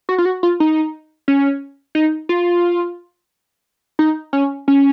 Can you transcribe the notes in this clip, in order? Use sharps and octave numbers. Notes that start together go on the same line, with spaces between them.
F#4
F4
F#4
F4
D#4
C#4
D#4
F4
D#4
C#4
C#4